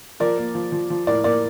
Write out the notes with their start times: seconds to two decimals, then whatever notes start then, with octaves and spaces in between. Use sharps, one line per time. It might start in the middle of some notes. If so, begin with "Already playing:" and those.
0.20 F3 A#4 D5
0.38 A#3
0.55 F3
0.72 F3
0.90 F3
1.07 A2 A#4 D5
1.24 A#3 A#4 D5